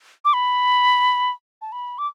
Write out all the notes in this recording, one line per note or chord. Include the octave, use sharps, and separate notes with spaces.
D6
B5
A5
B5
D6